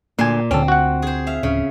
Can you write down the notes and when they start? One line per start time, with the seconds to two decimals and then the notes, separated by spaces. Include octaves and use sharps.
0.19 D2 A#2 A#3 G#5 C6
0.51 D2 D3 C4 C#4 A4
0.68 F#4 F#5
1.02 G#4 C5
1.27 E5 F5
1.43 D1 C#3